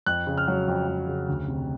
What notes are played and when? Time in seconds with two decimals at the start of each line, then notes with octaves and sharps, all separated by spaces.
0.06 F2 F#6
0.27 C#3
0.38 F6
0.48 F#3
0.68 F2
0.87 F2
1.08 C#3
1.28 D2
1.48 C3